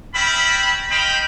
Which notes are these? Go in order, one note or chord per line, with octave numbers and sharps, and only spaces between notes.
C4 C#4 E5 B5
C5 D#5 F5 G5 B5